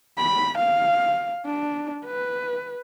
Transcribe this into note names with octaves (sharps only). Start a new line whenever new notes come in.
B5
F5
D4
B4